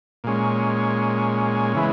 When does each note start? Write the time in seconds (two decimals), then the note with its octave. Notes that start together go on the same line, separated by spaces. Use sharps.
0.24 A#2 G#3 C#4
1.75 C#3 E3 G#3 B3